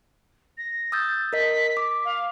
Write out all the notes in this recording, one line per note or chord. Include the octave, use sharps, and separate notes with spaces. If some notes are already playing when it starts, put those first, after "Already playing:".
A#6
D#6 E6 G6 A6
A#4 D#5 B6
D6
F5